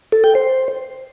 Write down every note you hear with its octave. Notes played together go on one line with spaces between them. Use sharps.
A4
G5
C5